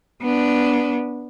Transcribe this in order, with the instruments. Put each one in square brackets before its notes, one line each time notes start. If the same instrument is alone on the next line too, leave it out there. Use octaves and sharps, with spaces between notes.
[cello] B3 D4